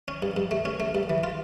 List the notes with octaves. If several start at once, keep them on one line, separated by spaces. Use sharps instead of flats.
C#4
G2
G2
A3
C#4
A3
G2
E3
F4